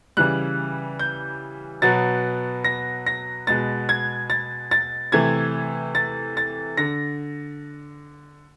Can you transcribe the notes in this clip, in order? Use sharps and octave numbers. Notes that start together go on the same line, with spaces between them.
C#3 E3 G3 F#6
G6
B2 F#3 B3 A6
A#6
A#6
B2 G#3 B3 A6
G#6
A6
A6
C3 E3 A3 G#6
A6
A6
D3 A#6